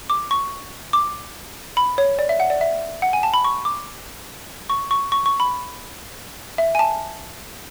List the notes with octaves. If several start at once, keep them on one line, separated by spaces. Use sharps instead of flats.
D6
C#6
D6
B5
C#5
D5
E5
F#5
D5
E5
F#5
G#5
A5
B5
C#6
D6
C#6
C#6
C#6
C#6
B5
E5
G#5
A5